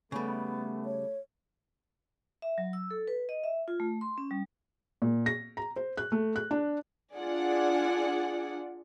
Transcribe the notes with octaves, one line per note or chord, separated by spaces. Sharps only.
C#3 G3 A3 B3
C#5
E5
F#3
E6
A4
B4
D#5
E5
F4
A3
C6
C#4
G3
A#2
A#6
A#5
C5
F#6
A3
F#6
D4
D4 F4 G#4 D5 F#5